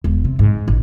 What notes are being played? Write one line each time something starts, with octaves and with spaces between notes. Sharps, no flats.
E1
C3
G#2
A1